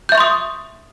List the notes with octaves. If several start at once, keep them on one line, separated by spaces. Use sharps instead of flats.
E5 C6 C#6 D#6 G6